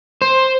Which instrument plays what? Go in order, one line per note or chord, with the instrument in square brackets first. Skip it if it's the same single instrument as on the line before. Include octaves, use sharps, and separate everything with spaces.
[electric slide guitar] C5